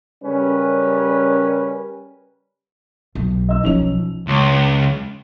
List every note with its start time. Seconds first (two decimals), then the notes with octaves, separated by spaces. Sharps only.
0.24 C#3 G3 C#4 A#4 B4
3.15 B1
3.49 D#5 E6
3.63 B1 F3 C#4 D#4 F7
4.27 C#2